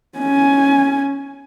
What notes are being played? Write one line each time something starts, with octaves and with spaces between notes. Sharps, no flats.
C#4 G#5